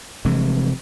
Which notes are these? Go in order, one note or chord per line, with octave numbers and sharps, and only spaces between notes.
F1 C3 E3 G#3